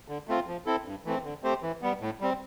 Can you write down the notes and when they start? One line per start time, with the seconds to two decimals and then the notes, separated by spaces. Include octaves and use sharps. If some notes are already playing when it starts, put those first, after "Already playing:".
0.08 D3
0.28 A3 C4 F4
0.47 F3
0.66 C4 E4 A4
0.85 G2
1.05 E3 A3 C4
1.24 D3
1.43 A3 C4 G4 C5
1.62 E3
1.82 G3 B3
2.00 A2
2.20 G3 C4